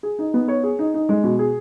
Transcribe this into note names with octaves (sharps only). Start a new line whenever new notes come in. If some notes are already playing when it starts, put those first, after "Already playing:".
G#4
D#4
B3
C#5
G#4
D#4
D#4
G#3
B2
G#4